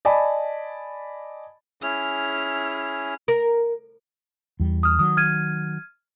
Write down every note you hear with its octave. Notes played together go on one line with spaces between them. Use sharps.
D5 D#5 G#5 A5 B5
C#4 E4 G#4 F6
A#4
E2 G3
D#6 F6
D#3 F#3 D#6
F6 G#6 D#7